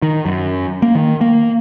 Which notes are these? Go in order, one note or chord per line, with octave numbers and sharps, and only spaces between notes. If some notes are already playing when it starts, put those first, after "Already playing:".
D#3
F#2
A#3
D#3
A#3